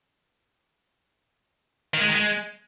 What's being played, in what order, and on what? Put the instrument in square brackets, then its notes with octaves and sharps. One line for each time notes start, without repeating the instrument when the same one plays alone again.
[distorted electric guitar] D#3
G#3
D#3
G#3